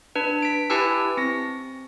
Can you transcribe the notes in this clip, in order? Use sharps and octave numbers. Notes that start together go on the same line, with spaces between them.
D4 B4
B6 D7
E4 G4 B4 G#5 A5 E6
C4 A#6